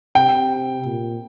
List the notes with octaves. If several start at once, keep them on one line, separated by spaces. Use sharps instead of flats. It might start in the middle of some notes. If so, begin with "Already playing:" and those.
C3 G5
A#2